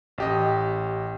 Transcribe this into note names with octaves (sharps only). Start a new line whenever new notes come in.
A1 G4 D#5